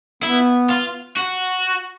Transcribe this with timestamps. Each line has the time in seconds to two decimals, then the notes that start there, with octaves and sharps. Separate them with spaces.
0.23 B3 E4
0.70 F4
1.17 F#4